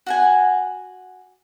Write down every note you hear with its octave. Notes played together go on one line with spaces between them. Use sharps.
F#4 F#5 G#5